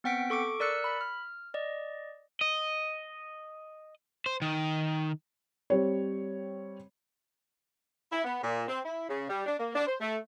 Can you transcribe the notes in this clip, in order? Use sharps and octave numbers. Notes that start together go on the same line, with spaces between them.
B3 C4 F#5 G5 B6 D7
A4 C#6 D6 D7
A#4 D5 E6 F#6 C#7
B5
F6
D5 D#5
D#5
C5
D#3
G3 C4 C#5
E4
B3
A#2
C4
E4
C#3
G3
D4
A#3
D4
C5
A3